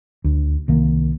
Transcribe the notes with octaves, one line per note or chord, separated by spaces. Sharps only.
D2
C2 D#3 A#3